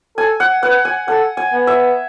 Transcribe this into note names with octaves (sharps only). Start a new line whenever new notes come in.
A4 G#5
F#5
B4 F#5
G#5
A4 F#5
G#5
B3
E5